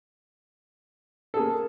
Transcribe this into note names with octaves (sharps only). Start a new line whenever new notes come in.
A#3 G#4 A4